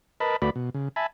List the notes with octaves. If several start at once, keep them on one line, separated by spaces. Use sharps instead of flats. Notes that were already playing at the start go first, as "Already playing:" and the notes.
A#4 B4 D#5 A5 B5
D2 A3 F#4 B4 D5 B5
B2
C#3
E5 G#5 A5 B5